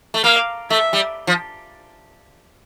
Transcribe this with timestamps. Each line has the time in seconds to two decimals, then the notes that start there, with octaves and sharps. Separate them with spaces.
0.14 A3
0.24 A#3 F5
0.70 A3 E5
0.93 G3
1.27 F3